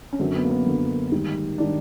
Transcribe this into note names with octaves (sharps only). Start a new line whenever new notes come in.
C#4
F#2 D3 F#3 C4
B3
A#3
B3
F#2 D3 F#3
G#2 D#3 G3
D#3 G3 D4